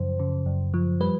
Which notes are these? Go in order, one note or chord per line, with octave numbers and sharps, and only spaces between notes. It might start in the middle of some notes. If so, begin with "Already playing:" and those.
Already playing: F#2 C#3 F3 C5
C#3
F#2
F3
G3 B4